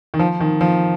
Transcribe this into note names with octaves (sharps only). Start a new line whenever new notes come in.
D#3
F3
D#3
F3